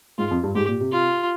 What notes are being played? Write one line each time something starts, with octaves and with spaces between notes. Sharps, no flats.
G#2 F4
F2
G2
G#2 G4
A#2
C3
F4